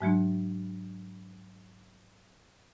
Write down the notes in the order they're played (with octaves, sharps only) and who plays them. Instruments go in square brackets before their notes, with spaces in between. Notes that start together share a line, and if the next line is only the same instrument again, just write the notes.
[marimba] G#2 F#3 G#3 D4